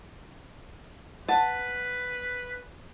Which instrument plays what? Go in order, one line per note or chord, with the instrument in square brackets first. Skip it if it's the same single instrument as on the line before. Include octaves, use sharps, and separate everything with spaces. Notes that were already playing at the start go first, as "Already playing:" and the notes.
[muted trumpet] B4 [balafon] F#5 [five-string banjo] A5